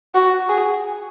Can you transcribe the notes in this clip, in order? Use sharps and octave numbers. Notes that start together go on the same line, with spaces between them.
F#4
G#4